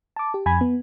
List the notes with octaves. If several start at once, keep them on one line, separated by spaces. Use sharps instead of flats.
A5 D6
G4
F2 G#5 B5 G#6
B3